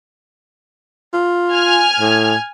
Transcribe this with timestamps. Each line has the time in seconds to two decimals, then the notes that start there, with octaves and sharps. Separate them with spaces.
1.13 F4
1.50 G#5 F6 G#6
2.00 A2